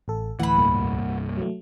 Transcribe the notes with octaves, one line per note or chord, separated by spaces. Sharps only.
A1 A4
D2 A2 E3 F#5 B5
C2 G2 A#3
F#3 A3